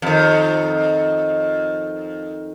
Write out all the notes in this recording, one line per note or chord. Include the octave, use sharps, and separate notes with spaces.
F2 D#3